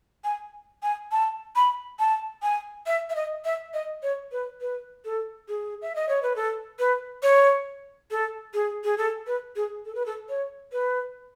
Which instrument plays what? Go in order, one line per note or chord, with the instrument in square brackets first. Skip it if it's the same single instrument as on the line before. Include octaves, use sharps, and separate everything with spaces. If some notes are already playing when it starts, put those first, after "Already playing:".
[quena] G#5
G#5
A5
B5
A5
G#5
E5
E5
D#5
E5
D#5
C#5
B4
B4
A4
G#4
E5
D#5
C#5
B4
A4
B4
C#5
A4
G#4
G#4
A4
B4
G#4
A4
B4
A4
C#5
B4